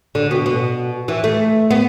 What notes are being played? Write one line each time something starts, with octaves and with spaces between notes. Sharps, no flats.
D3
B2
B2
E3
A3
B3